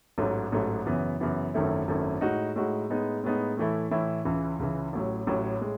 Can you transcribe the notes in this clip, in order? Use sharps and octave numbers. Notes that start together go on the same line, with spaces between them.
A1 G#2 F#3 A3
A1 G#2 F#3 A3
F#2 C#3 E3 B3
F#2 C#3 E3 B3
G#1 F#2 D#3 A3 E4
G#1 F#2 D#3 A3 E4
A2 G#3 D#4 F#4
A2 G#3 D#4 F#4
A2 G#3 B3 D#4
A2 G#3 B3 D#4
A2 E3 A3 E4
A2 E3 A3 E4
C#2 C#3 E3
C#2 C#3 E3
A1 A2 F#3
A1 A2 F#3
A2 G#3